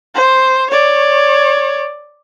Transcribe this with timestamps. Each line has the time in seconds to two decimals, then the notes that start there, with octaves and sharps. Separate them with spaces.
0.15 C5
0.70 C#5 D5